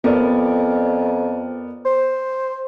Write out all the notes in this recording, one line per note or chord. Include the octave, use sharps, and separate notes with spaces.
F2 B3 A#4 D5
C5